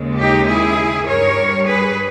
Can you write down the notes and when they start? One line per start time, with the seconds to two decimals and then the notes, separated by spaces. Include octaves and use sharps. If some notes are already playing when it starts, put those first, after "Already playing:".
Already playing: D#2 C#3 G#3
0.18 D#4 G4
0.47 E4 G#4
1.06 G2 G3 A#4 C#5
1.65 G#4 B4